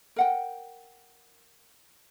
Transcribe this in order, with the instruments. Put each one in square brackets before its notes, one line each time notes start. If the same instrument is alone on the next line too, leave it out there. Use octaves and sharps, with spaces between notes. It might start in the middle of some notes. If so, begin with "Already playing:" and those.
[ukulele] A#4 F#5 G5